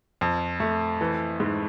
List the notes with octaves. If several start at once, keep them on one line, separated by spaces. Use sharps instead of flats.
F2
A3
E3
G#2